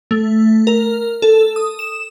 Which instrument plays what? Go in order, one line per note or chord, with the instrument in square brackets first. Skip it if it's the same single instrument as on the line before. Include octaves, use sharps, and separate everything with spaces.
[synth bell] A3
A#4
A4
D#6
E7